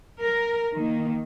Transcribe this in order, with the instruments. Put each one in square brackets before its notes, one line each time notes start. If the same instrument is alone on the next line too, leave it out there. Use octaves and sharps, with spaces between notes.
[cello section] A#4
D#3 A#3